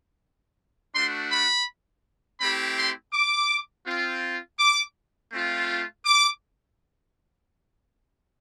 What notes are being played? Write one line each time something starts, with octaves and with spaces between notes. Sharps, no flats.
A3 D4 F#4 C6
B5
A3 C4 E4 G4 B5
C6
D6
C4 F4
D6
A3 C4 F4
D6